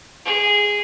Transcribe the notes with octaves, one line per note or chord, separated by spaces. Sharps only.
G#4